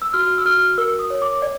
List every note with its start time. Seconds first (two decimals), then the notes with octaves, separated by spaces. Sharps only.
0.02 E6
0.13 F#4 F6
0.38 E6
0.45 F#4 F6
0.78 A#4 E6
0.99 D#6
1.10 C#5
1.22 D6
1.42 D5